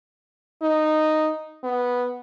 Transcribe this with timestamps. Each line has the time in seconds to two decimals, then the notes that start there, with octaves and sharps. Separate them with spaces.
0.62 D#4
1.64 B3